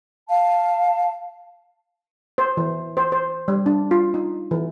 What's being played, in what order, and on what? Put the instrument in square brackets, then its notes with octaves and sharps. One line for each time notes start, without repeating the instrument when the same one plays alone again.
[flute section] F5 A5
[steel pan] C5
E3
C5
C5
G3
D4
F4
D#4
E3